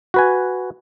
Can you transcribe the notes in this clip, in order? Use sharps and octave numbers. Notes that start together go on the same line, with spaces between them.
F#4 B4 G#5